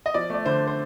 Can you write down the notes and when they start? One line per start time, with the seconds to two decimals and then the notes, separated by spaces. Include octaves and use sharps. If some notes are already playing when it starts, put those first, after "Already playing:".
0.06 D#5
0.14 F3 D5
0.30 A3 D5
0.46 D3 C5
0.67 C5